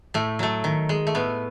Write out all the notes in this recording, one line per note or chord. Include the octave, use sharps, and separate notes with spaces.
A2 A3
F#3 A3
D#3
G#3
A3
A2 B3